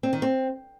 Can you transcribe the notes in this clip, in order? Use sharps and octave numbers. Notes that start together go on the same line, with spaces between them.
C4
D#3
C4